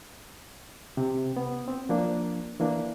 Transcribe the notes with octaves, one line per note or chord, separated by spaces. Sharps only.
C3
B3
C4
F3 A#3 D4
E3 A#3 D4